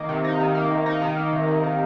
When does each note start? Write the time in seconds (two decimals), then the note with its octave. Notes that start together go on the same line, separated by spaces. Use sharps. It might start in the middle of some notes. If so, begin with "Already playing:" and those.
Already playing: D#3 A#3
0.09 C3
0.24 D#4
0.40 D#3
0.55 A#3
0.70 C3
0.86 D#4
1.02 D#3
1.17 A#3
1.32 C3
1.48 C3
1.63 D#3